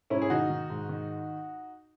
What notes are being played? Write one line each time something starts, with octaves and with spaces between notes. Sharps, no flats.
G#2 C#4 E4
G#4
D#3 D#4 F#4
D#3
G#2
D#3